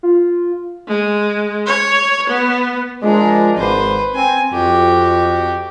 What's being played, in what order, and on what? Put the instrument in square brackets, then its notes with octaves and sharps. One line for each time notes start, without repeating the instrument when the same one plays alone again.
[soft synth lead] F4
[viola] G#3
C#5
B3
[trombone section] F3 G#3 [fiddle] D4 A#4
[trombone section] G#1 [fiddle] B4 C5
[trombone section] C4 [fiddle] G#5
[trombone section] F2 [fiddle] F#4 G4